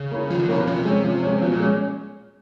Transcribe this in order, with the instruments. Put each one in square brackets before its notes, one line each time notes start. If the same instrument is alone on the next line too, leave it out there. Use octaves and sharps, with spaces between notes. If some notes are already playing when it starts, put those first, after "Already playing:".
Already playing: [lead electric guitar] C#3
[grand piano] A#3 C#4 E4
[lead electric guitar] D#3 [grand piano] F3
[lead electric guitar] D3
[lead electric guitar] C3 [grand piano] A#3 C#4 E4
[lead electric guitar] B2
[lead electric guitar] C3 [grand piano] F3
[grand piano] G#3 C#4
F3
G#3 C#4
[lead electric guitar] B2 [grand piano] F3
[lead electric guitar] A#2
[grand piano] G#3 C#4